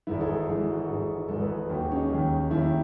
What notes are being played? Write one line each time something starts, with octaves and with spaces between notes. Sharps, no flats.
G#1 G#2 E3 E4
A4
G#4
G#1 G#2 E3
F#4
G#4
G#1 G#2 E3 A4
G#1 G#2 E3 A4
B4
A4
D#2 D#3 F#4
G#4
C#4
D#4
D#2 D#3
D#2 D#3 E4